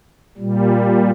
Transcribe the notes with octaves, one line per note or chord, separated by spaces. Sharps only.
A#2 G3